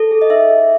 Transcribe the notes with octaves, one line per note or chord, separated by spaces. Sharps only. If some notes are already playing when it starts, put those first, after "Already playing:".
Already playing: A4
G#4
D#5
D#4 E5
G#4